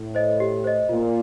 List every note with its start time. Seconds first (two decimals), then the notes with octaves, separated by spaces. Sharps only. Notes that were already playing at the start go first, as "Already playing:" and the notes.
Already playing: A2
0.15 C5 D#5
0.40 G4
0.64 C5 D#5
0.89 A#2 F4